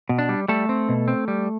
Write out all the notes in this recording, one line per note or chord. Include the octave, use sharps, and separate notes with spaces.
B2
D4
G3
G3 A3 A4
C4
B2
C4
G3